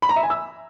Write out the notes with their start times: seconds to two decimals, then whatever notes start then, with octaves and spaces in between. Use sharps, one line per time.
0.02 B5
0.09 A#5
0.16 E5
0.23 G#5
0.30 E6